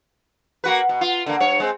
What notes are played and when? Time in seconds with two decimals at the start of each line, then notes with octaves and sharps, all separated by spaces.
0.64 A#3 F#4 B4
0.89 B2
1.01 F4
1.26 D3 A#3
1.40 G2 C#5
1.60 G#3 C4